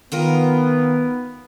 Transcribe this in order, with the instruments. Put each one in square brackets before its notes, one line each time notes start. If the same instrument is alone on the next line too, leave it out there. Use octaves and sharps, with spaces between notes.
[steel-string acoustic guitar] D#3 F4 A#4 [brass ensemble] B3